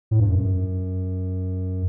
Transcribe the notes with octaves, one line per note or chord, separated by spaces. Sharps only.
A2
G2
F#2